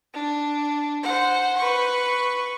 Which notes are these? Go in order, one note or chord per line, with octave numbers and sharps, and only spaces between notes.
D4
C5 F#5
B4 C#6